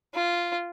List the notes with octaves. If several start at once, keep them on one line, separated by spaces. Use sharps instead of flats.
F4